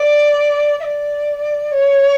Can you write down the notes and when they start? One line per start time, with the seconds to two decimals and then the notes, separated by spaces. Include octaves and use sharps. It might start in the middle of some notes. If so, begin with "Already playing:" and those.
Already playing: D5
0.80 E5
0.83 D5
1.72 C#5